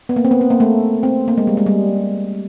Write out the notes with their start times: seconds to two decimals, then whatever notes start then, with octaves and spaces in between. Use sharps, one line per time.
0.09 B3
0.16 A#3
0.25 C4
0.31 B3
0.41 C4
0.50 A#3
0.60 A3
1.03 C4
1.28 A#3
1.38 G#3
1.47 G3
1.57 G#3
1.66 G3